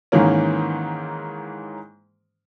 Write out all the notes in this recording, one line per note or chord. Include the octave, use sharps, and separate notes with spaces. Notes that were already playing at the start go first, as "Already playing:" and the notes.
G#2 D#3 E3 A#3 C#4